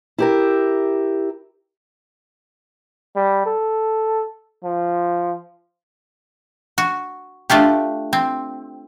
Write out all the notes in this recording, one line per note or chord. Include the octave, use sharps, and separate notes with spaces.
E4 G4 A#4
G3
A4
F3
F#4
A3 D4 F4 G4
C4